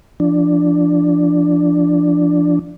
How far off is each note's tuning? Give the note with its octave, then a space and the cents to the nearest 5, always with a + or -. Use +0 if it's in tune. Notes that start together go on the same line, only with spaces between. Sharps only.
F3 -30 D4 +0